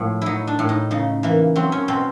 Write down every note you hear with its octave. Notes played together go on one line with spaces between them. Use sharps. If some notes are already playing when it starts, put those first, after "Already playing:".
Already playing: A2 F3
F#3 D#4 E4
D4
A2
D#4
C#3 D#4
E3 A#3
F#3 C4
C#4
B2 C4